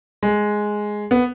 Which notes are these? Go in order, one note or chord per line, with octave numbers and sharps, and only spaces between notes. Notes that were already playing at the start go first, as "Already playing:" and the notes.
G#3
B3